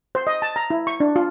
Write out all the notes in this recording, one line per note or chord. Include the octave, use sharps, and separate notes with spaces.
C5
D#5
A5
A#5
E4
C#6
D4
F4